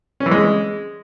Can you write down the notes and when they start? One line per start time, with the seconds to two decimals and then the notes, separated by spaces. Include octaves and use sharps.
0.20 C#4
0.26 E3
0.31 G#3